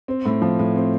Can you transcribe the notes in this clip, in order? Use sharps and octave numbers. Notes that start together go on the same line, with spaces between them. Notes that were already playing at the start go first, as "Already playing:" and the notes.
C4
A2
F3
A2
C4